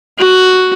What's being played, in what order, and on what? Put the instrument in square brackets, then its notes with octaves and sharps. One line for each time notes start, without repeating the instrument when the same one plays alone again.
[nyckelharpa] F#4